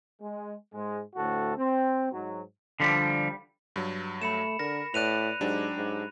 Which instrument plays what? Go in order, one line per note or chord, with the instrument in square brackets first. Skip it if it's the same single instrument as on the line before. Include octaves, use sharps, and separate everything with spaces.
[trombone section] G#3
G#2 G#3
D2 A2 F#4 A4
C4
G#2 F#3
[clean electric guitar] D3 F3 G3
[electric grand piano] G2 F#3
[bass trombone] A3 [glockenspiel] B5 C#7 E7
[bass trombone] D3 [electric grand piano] A#4 [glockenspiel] A#6
[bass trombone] A2 [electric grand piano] B4 D5 [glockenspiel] F#6 D#7 F7
[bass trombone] G#2 [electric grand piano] F#3 D4 G4
[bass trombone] G#2